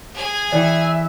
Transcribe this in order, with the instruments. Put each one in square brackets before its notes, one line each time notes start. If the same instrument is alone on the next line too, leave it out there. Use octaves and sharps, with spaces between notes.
[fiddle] G#4 G#5
[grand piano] E3 [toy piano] D5 G5 [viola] E5